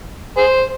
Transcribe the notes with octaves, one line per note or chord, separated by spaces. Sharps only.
G#4 C5